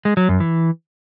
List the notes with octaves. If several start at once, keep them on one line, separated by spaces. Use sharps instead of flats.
G#3
F#3
F#2
E3